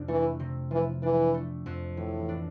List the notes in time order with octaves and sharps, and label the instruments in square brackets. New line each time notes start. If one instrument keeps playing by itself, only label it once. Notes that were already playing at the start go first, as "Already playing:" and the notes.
Already playing: [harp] F2 C3 D4
[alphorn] E3 [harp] A3
[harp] C3
[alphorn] E3 [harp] F3
[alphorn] E3 [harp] D4
[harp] A3
F2
[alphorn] A2 [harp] E3
[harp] D4